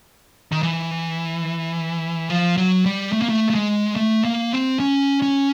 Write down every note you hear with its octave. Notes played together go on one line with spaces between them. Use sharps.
D#3
E3
F3
F#3
G3
A3
A#3
A3
A3
G#3
A3
A#3
C4
C#4
C#4